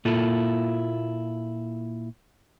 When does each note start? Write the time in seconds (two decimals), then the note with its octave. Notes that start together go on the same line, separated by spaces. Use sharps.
0.05 A#2 A#3 E4 F4 A4